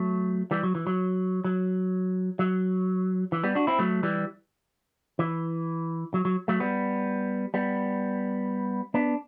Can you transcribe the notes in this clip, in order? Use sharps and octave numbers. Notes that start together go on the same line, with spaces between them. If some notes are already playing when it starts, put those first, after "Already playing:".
Already playing: F#3 A3
E3 G3
F#3
E3
F#3
F#3
F#3
E3
G3 B3
D4 F#4
C4 E4
F#3 A3
E3 G3
E3
F#3
F#3
F#3 A3
G3 B3
G3 B3
B3 D4